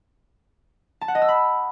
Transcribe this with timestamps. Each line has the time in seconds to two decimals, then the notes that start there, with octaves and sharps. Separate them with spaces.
1.01 A5
1.08 F#5
1.15 D#5
1.22 E6
1.28 B5